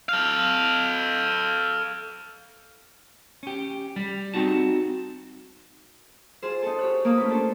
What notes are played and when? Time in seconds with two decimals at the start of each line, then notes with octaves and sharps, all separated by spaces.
0.09 A4 F5
3.43 C#4 G4
3.96 G3
4.34 C4 C#4 D#4 F#4 A5
6.42 F4 G#4 C5
6.63 D#4 A4
6.79 G4 C#5 F#6
7.05 A#3 C#5 F5 D#6
7.17 A3 C#4 F4 B4
7.29 D4 A4 C5